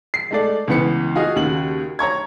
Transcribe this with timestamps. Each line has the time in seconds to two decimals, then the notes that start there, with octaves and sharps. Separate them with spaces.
0.14 C7
0.31 G#3 A3 D5
0.68 C#2 E3 B3 B4 C#7
1.15 F4 F#4 G#4 D#5 F5
1.36 D#2 C#3 F#4 F#7
1.99 C#5 A#5 C#6 G#6